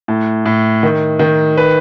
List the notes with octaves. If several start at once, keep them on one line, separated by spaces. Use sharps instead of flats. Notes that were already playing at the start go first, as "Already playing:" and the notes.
A2
A2
D#3
D#3
B4